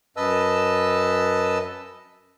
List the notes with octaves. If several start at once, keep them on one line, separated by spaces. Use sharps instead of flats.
F#2 B4 D#5 A5 E6